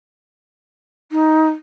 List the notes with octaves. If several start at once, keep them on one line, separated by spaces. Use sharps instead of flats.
D#4